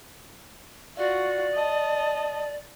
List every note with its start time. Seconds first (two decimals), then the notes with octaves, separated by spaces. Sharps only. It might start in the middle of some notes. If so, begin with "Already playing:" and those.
0.97 F4 F#4 D5
1.54 D#5 A5